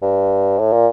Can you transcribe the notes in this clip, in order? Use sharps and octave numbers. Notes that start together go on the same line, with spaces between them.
G2
A2
A#2